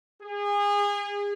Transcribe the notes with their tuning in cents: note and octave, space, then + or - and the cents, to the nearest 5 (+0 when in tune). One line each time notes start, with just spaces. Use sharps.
G#4 -30